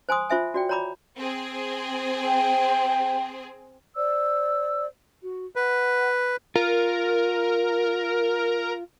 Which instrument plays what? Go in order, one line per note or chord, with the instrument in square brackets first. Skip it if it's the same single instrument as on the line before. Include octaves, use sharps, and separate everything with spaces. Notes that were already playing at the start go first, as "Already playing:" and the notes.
[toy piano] C5 G#5 C6 D#6
F4 C5 E5 G#5
F#4 D5 G5
C#5 D5 A#5 B5 D6
[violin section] C4 G#4
[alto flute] G5
[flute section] C5 D5 E6
F#4
[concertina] B4 [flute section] F#5
[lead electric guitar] F4 [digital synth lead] A#4